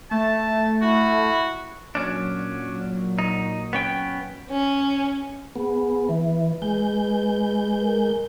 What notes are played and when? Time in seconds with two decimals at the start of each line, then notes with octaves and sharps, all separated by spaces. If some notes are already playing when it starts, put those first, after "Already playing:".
0.11 A3 A5
0.82 E4 F#4
1.95 A#2 F#3 C#4 D4
3.19 D#4
3.73 B3 C#4 G5
4.51 C#4
5.56 B3 G#4
6.09 E3 B4
6.62 G#3 G6
7.84 A#4